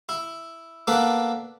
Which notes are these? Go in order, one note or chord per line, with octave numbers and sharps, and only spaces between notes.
E4
A#3 B3 D4 A4 B4